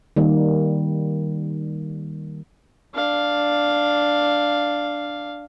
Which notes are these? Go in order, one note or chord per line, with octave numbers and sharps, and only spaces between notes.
D#3 G3 A#3
D4 F5